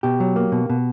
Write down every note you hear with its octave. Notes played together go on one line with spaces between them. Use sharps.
B2 G4
F#3
A#3
B2
B2